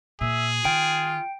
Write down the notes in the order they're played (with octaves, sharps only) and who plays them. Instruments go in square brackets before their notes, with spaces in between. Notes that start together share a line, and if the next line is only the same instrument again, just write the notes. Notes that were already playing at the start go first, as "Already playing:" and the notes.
[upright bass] A#2 [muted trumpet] G#4 [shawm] E5
[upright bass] D#3 [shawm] F4 [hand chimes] G5 D7